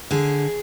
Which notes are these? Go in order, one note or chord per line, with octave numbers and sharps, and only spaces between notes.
D3 G#4